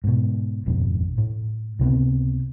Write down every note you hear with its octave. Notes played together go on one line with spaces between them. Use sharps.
G#2 B2
D#1 G#1 F2 B2
A2
C#2 C3 B3 C4